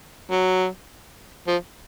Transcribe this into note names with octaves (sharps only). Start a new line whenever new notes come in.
F#3
F3